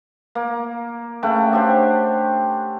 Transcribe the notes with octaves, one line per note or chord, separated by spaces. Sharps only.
A#3
C#3 A3 F#5 G5
D4 G4 C5